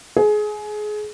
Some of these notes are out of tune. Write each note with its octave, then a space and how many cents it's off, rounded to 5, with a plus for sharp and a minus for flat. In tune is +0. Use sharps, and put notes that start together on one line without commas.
G#4 +25